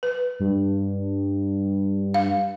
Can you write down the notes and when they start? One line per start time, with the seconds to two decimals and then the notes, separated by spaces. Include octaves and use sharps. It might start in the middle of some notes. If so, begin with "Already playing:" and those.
0.03 B4
0.40 G2
2.14 F5